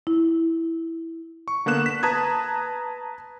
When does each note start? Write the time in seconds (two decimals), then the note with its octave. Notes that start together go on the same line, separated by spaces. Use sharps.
0.07 E4
1.48 C#6
1.66 D3 A#3 B3 F#6 E7
1.86 B6
2.03 B4 A5 A#5 D#6 G#6